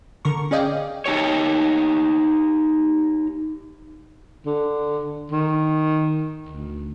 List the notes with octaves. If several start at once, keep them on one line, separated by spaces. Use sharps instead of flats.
D3 A#4 C#6
C#4 G#4 D5 D#5 F5 G5
D#4 G4 C#5
D3
D#3
D2